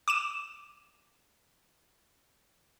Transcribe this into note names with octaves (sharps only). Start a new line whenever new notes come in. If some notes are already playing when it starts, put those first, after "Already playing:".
D6 D#7 E7